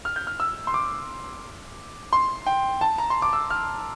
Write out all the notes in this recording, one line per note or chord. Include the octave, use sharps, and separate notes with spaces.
F6
G6
F6
E6
C6
D6
C6
G5
A5
A#5
C6
D6
E6
F6